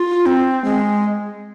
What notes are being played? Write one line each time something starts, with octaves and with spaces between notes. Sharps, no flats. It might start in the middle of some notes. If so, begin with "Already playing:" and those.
Already playing: F4
C4
G#3